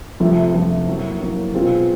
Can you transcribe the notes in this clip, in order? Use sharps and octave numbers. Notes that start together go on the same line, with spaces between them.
F2 C3 F3 A3
F2 C3 F3 A3
A2 F#3 A#3
A2 F#3 A#3
B2 G#3 C4 F4